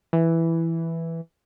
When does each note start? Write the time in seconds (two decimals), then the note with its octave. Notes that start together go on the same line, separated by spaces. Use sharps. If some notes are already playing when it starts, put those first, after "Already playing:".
0.13 E3